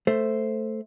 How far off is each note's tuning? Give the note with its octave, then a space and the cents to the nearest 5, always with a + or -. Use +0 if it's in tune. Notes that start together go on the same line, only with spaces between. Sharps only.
A3 +0 C5 +0